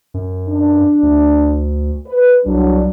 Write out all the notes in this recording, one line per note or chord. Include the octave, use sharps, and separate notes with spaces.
F#2
D4
D2
B4
C2 F#3 D4